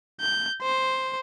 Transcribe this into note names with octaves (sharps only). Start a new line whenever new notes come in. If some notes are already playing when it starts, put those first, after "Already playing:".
G6
C5